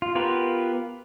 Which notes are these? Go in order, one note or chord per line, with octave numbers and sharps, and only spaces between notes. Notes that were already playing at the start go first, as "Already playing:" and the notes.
F4
B3 F4 G4 A#4 B4